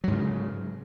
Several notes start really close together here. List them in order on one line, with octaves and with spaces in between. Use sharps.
F#3 G#2 C#3